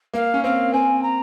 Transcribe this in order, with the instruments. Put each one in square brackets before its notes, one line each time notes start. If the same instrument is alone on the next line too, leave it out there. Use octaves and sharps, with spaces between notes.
[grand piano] A#3 [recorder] F5
[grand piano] C#4
[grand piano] C4 [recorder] F5
[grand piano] C4 [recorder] G#5
[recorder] A#5